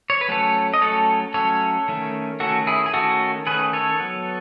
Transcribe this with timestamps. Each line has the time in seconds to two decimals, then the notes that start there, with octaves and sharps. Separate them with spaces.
0.10 C#5
0.21 B4
0.28 F#3 A3 C#4 A4 C#5
0.74 D#5
0.81 F#3 A3 C#4 A4 C#5
1.34 F#3 A3 C#4 A4 C#5
1.88 D#3 A3 C#4
2.40 D#3 A3 C#4 F#4 A4
2.67 E4 G#4
2.86 G#4
2.94 D#3 A3 C#4 F#4 A4
3.47 D#3 A3 C#4 G#4 B4
3.73 A4 C#5
3.99 F#3 B3